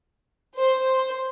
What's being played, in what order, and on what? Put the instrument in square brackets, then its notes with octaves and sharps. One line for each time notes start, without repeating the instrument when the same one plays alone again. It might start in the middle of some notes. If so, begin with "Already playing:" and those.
[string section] C5